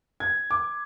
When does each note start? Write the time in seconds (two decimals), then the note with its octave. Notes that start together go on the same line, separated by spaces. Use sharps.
0.20 G#6
0.51 D6